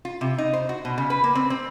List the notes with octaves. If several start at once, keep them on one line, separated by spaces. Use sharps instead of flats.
F4
C3
D#4
C5
F#4
B2
C#3
B4
A#3
C4
C4